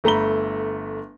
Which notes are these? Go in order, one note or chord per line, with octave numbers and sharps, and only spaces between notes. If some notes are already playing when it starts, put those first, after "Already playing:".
G1 A3 A#5 B5 G7